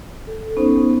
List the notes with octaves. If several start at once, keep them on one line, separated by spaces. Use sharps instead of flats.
A4
B3 C#4 D#4 C5